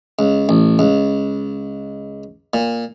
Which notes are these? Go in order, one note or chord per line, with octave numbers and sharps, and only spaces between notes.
C#2
A1
C#2
A#2